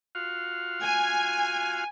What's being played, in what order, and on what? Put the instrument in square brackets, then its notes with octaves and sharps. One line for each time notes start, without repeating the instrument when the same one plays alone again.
[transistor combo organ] F4 F#4 F5
[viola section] G#5